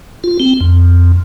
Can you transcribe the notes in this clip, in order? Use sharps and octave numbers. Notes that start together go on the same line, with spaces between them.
F4
C4
F2